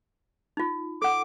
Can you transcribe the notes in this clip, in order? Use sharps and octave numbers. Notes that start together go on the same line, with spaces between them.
D#4 F4
A4 F#5 D6